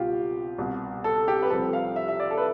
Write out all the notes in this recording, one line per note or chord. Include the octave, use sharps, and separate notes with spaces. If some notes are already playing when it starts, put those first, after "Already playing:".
Already playing: C2 B2 F4 G4
C2 B2
A4
G4
B4
C2 C3 F3 A4
F5
E5
E5
D5
A4
B4